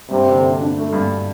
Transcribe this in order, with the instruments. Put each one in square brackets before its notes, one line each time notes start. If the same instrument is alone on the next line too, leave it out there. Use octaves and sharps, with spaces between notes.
[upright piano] G2 [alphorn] C3
[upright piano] D3
D3
D4
A3
G2